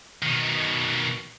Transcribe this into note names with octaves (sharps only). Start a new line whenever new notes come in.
B2 D#3